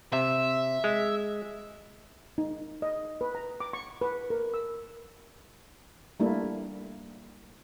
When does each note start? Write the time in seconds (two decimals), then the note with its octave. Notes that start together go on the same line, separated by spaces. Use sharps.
0.13 C3 E5
0.84 G#3
2.38 D#4
2.82 D#5
3.21 B4
3.35 A#5
3.60 D6
3.73 C#6
4.01 B4
4.30 A#4
4.54 E6
6.20 G3 A3 A#3 D4 E4